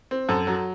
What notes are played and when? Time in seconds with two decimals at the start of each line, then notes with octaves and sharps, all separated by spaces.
0.11 C4
0.29 F#2 A4
0.47 F#3